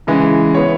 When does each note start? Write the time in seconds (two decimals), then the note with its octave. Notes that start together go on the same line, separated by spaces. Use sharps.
0.07 C#3 E3 G#3
0.54 B3 E4 C#5